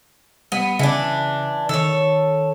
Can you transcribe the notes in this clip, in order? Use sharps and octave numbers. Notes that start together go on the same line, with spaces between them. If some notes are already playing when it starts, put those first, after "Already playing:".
G3 B3
C#3 E3 D4
D#3 A4 C#5